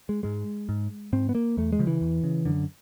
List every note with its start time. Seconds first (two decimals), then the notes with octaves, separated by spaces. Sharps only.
0.09 G#3
0.23 G#2 G#3
0.69 G#2
1.13 G#2 C4
1.29 B3
1.35 A#3
1.57 E2 A3
1.72 G#3
1.79 C#3 F3
1.87 E3
2.01 E2
2.24 C#3
2.45 F#2 D3